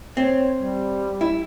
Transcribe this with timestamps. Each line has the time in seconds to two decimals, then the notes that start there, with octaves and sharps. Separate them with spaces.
0.17 C4 C#5
0.60 G3
1.21 E4